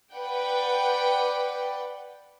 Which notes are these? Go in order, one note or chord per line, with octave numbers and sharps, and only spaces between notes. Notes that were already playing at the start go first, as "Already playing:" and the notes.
B4 D5 F#5 G5